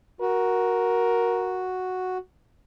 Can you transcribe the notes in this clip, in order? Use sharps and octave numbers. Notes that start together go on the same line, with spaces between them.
F#4 A#4